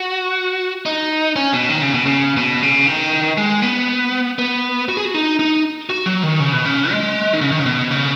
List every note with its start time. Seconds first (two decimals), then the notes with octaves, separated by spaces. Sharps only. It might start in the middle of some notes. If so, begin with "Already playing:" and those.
Already playing: F#4
0.86 D#4
1.36 C#4
1.53 B2
1.69 D#3
1.81 C#3
1.94 B2
2.06 C#3
2.37 B2
2.63 C#3
2.87 D#3
3.38 G#3
3.62 B3
4.39 B3
4.89 F#4
4.97 G#4
5.05 F#4
5.14 D#4
5.39 D#4
5.90 F#4
6.06 F#3
6.23 D#3
6.40 C#3
6.53 B2
6.65 C#3
6.91 G#3
7.33 D#3
7.41 C#3
7.52 D#3
7.59 C#3
7.66 B2
7.91 C#3